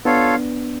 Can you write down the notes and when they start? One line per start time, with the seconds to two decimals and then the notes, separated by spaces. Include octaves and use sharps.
0.05 B3 D4 F4 A4 C#5 F5